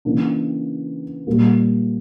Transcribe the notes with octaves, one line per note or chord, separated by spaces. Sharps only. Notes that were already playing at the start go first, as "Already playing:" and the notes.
C#3 E3 A#3 D4
A#2 G3 A#3